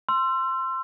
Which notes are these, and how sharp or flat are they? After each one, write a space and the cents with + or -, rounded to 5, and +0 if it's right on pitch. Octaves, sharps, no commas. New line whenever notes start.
C6 +0 E6 +35